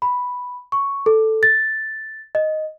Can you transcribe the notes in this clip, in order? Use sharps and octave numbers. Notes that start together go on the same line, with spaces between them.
B5
C#6
A4
A6
D#5